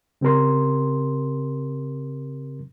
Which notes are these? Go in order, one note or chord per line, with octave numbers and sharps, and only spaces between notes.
C#3 C4 G4 A#4 C6